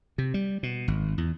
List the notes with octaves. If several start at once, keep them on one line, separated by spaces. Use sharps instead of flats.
C3
G3
B2
G#1
E2